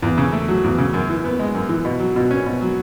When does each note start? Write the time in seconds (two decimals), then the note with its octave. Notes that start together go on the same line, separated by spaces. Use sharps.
0.02 E2
0.18 C#3
0.33 A3
0.48 F#3
0.64 E2
0.78 C#3
0.94 F#2
1.09 E3
1.25 B3
1.39 G#3
1.55 F#2
1.69 E3
1.85 B2
2.00 F#3
2.16 B2
2.31 C#4
2.46 B2
2.61 F#3